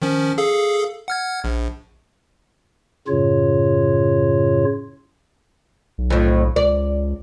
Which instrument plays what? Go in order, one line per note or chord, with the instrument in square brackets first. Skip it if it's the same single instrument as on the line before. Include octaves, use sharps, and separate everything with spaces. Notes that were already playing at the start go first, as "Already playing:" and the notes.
[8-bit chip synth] D#3 F3 C#4
G#4 A4 F5
F#5 F6 G#6
A#1
[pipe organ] F#2 A2 C#3 F4 C#5
[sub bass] B1
[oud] F2 A2
[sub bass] C#2 [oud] D5